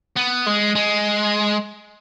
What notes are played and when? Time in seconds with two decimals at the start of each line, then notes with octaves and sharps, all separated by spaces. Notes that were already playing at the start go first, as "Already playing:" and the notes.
0.16 B3
0.46 G#3
0.75 G#3